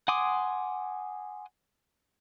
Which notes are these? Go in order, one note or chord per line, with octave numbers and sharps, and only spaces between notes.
F#5 G#5 C6 D6 D#6